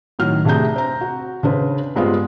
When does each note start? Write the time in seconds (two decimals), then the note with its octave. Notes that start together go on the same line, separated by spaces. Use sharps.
0.19 A2 D#3 F#3 F6
0.45 C3 A3 D4 G#4 A#5 G6
0.76 C4 A#5
1.01 F#4
1.43 C#3 D4 B4 C5
1.96 G2 G#3 B3 C4 F4